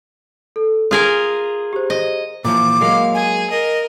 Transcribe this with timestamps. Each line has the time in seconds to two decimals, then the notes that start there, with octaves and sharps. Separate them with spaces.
0.56 A4
0.91 F4 G#4 A#4 D#6
1.73 G4 C5
1.90 D#5
2.45 A#2 E3 F3 D6
2.81 F#3 G#3 A#3 F5
3.14 G#4 G#5
3.50 A#4 D#5